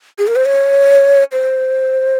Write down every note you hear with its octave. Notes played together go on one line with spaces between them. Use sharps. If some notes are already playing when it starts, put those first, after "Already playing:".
G#4
A#4
C5
C#5
C5